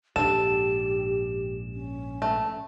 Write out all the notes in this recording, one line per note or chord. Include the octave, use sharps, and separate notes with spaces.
A#1 G#2 D4 G4 A4 E7
C#4
A3